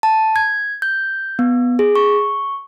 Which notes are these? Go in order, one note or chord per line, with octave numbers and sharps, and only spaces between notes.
A5
G#6
G6
B3
G#4
C#6